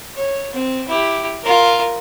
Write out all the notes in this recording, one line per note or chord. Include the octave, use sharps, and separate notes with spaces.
C#5
C4
E4 G4
F4 A#4